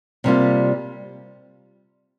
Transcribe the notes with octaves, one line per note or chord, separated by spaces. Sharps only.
C3 G3 A#3 F4